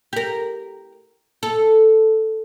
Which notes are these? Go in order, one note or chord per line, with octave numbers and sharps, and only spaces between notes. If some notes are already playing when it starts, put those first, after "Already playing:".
G4 A#4
A4